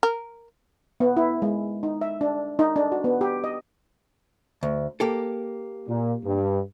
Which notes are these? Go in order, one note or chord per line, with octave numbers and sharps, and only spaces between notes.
A#4
B3
E4
G#3
D#4
E5
D4
D#4
D4
F#4
B3
G4
D#5
D2
A#3 G4 A4
A#2
G2